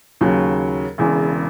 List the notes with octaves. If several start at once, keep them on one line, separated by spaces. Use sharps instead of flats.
D#2 C#3 F#3
E1 E2 C#3